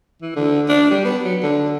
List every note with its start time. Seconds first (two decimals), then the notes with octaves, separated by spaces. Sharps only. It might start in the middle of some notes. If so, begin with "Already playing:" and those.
0.22 E3
0.36 D3
0.68 D4
0.91 G3
1.05 B3
1.24 F#3
1.43 D3